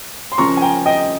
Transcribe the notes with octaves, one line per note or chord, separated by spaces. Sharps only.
C6
C#3 F3 A#3 C#4 A#5 C#6
G#5
G5 A#5
D#5 G5